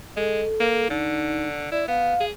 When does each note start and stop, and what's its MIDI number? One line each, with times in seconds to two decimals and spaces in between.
0.17 0.44 56
0.17 0.90 69
0.60 0.87 58
0.90 1.68 50
0.90 1.47 63
1.72 1.87 64
1.72 1.87 74
1.88 2.15 59
1.88 2.24 77
2.20 2.31 68